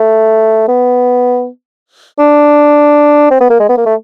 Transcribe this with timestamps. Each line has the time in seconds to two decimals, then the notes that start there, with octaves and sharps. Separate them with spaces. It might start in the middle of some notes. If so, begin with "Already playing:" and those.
Already playing: A3
0.68 B3
2.19 D4
3.31 C4
3.41 B3
3.50 A#3
3.60 G#3
3.69 B3
3.77 A#3
3.86 A3